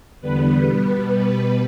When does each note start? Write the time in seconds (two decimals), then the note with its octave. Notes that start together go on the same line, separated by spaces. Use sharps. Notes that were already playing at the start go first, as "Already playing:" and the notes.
0.21 E2 D3 G3 B3 B4
0.65 B2 G3 B3 B4
1.10 B2 G3 B3